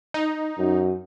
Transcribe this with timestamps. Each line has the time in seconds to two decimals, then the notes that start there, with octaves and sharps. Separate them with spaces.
0.14 D#4
0.58 F#2